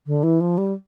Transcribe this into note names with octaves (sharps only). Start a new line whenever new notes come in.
D3
E3
F3
G3